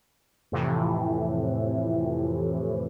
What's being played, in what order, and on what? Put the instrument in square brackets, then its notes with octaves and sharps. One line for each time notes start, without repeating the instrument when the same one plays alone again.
[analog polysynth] F2 A2 C3 E3